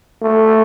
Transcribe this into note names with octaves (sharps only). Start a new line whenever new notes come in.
A3